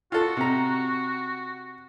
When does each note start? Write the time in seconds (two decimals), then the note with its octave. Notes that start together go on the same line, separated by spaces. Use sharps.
0.12 F4 F#4 A4
0.37 C3 A#5